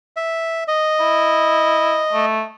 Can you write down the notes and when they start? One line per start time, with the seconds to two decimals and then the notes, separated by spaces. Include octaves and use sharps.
0.16 E5
0.68 D#5
1.00 E4
2.13 A3